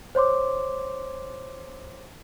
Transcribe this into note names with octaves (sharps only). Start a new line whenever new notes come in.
C5 C#5 C6 D6